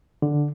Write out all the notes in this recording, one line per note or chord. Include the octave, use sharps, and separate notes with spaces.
D3